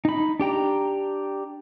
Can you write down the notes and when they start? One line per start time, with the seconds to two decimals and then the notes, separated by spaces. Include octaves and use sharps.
0.05 D#4 B5
0.40 D4 G4 G5 A#5